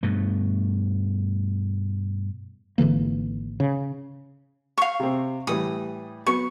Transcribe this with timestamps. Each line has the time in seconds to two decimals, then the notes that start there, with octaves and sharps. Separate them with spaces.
0.03 G2 B2 A3
2.78 G#1 D3 E3 A#3
3.60 C#3
4.77 F5 C#6
5.00 C3 C4
5.47 A2 E3 G3 D#6
6.26 F#3 B3 C#6